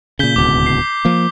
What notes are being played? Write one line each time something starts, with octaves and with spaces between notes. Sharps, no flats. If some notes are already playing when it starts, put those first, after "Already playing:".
A#2 C#3 G6 B6 G7
D1 C#2 B2 D6
C7
F3 A#3